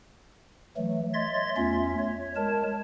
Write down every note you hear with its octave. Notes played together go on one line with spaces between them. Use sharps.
E3 F#3 A3
C#5 D#5 E5 C6 A6
E2 A3 C#4 F4 E5
C#5
G#3 A#4 C#5 A5